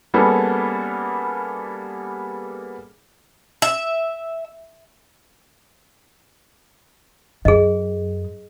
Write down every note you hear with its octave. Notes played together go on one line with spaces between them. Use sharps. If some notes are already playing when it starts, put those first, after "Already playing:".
G3 A#3 B3 C#4 G#4 A4
E5
F#2 G#4 D#5